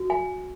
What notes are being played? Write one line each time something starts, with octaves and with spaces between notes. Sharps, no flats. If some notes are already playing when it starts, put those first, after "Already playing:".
Already playing: F#4
G#5